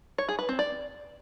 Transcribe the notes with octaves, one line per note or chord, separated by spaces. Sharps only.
C#5
G#4
B4
C4
D5